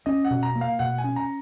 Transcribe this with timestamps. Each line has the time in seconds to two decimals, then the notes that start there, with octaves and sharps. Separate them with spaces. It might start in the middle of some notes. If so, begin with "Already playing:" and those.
0.06 C#4 D#5
0.25 F#5
0.31 B2
0.43 A#5
0.55 A#3
0.61 F5
0.79 B2 F#5
0.98 G#5
1.04 C#4
1.16 A#5